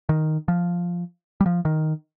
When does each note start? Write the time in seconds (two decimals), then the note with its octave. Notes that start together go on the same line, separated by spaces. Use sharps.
0.09 D#3
0.48 F3
1.41 G3
1.46 F3
1.65 D#3